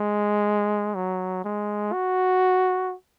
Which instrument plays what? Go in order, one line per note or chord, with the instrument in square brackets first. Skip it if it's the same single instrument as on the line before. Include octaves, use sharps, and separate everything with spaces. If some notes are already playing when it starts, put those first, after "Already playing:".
Already playing: [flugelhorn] G#3
F#3
G#3
F#4